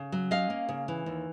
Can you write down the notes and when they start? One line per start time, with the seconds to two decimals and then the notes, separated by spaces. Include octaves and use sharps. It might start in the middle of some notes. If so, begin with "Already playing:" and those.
Already playing: C#3
0.12 F#3
0.31 C#4 D#5 F5
0.50 A#3
0.69 C#3
0.88 E3
1.06 D#2